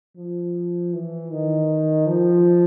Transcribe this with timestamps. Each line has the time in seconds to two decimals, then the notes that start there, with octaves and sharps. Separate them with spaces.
0.17 F3
0.93 E3
1.31 D#3
2.07 F3